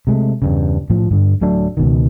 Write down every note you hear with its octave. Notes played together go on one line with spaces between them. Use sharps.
C3 G#3 A3
E2 G2 C#3
A2 F3
G2 D3
D1 F#3 A3 D4
C#2 B2 D#3